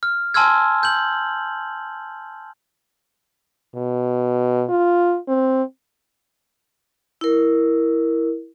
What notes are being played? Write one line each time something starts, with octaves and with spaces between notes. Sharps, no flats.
F6
G#5 A5 C6 E6 F6 G#6
G6 F#7
B2
F4
C4
E4 A#4